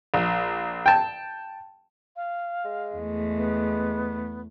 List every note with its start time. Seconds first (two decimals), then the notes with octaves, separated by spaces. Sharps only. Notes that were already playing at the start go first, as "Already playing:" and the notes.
0.14 A#1
0.86 G5 A5
2.16 F5
2.65 G#3
2.96 E2 A3
3.36 B3